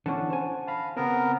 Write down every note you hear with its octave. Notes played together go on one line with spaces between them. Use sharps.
D3 E3 C#4 F#5 A5
C5 G#5
F5 A5 B5
C#3 B3 C4 A#4